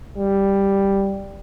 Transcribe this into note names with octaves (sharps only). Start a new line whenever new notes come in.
G3